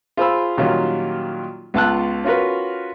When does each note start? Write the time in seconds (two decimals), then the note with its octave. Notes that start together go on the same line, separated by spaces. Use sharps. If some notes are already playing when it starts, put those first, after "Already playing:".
0.17 F4 G#4 C5 G#5 B5 E6
0.58 A#2 D#3 F#3 G3 C#4 F4
1.74 C#2 B3 F4 A5 E6 F#6
2.24 C#4 F4 F#4 A#4 B4